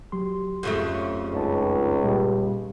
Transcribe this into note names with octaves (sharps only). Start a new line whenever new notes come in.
F#3 G4 C6
F2 C#3 A3
C#2 F#2 D#4 A5
A#2 G3 G4